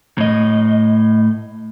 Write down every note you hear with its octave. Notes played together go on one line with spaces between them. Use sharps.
A2 D#5